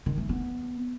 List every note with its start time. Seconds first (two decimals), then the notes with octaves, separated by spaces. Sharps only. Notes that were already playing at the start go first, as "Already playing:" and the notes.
0.06 D#3
0.18 A3
0.29 B3